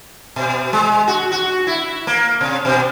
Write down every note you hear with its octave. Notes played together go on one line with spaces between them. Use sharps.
B2
G#3
F#4
F#4
E4
A#3
C3
B2